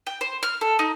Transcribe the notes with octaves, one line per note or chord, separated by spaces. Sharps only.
G5
C5
F6
A4
D#4